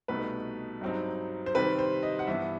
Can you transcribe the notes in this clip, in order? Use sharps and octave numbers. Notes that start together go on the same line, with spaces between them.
C2 B2 A3 D#4 B4
G2 F#3 C4 D#4
C5
C3 D#3 G3 C4 B4
C5
D#5
F#5
G2 E3 B3 E5